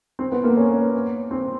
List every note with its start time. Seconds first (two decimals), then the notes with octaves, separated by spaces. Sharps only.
0.19 C4
0.32 B3
0.44 A#3
0.57 C#4
1.31 C4